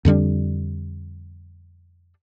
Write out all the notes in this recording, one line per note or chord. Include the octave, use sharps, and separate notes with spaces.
F2 D3 G3 D4